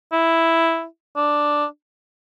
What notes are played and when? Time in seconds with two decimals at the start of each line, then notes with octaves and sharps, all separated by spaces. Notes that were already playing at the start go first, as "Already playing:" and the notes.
0.12 E4
1.17 D4